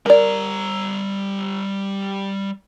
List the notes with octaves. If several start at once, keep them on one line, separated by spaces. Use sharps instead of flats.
G3 A#4 D5 A#5